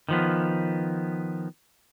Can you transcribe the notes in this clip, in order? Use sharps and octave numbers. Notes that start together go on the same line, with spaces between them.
D#3 F3 B3